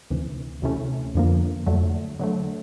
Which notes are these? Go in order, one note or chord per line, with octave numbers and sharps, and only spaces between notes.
D2 C3 E3
D2 C3 E3 A3 C#4
F2 D3 F3 A#3
F2 D3 F#3 A3
D3 F#3 A3